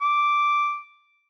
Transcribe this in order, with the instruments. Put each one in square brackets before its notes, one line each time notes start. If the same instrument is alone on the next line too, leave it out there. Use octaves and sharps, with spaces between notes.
[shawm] D6